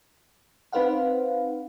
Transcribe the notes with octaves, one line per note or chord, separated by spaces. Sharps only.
C4 D#4 B4 C5 F5 F#5